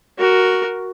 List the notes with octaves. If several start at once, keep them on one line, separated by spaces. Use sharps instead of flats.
F#4 A#4